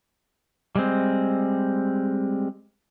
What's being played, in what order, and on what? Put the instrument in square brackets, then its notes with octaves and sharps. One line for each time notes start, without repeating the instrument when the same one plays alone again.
[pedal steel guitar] G3 G#3 C4